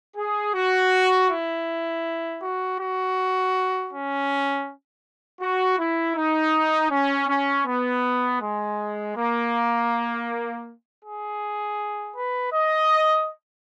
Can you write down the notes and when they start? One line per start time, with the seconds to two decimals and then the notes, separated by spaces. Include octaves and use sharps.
0.17 G#4
0.54 F#4
1.28 E4
2.41 F#4
2.79 F#4
3.92 C#4
5.41 F#4
5.78 E4
6.16 D#4
6.91 C#4
7.28 C#4
7.66 B3
8.41 G#3
9.16 A#3
11.03 G#4
12.15 B4
12.53 D#5